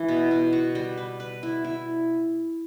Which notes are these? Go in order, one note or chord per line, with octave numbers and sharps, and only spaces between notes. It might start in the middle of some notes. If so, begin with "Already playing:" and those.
Already playing: E3 E4
B2
B2
F#4
G3
B4
B4
E4
E4